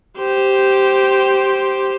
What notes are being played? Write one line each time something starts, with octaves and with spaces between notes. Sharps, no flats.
G4 C5